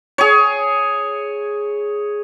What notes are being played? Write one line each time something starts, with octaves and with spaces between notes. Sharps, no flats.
G#4 C#5